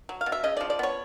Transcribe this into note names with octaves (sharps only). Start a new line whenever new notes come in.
F#3
F5
B2
E5
C#3 D#5
F3 D5
D5
B3 C#5